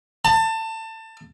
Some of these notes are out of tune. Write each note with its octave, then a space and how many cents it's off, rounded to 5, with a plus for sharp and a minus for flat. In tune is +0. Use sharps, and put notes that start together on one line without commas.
A5 +25